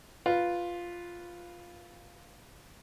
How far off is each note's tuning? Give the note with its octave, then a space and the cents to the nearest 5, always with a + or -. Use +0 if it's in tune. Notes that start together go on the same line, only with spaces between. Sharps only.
F4 +0 B4 +0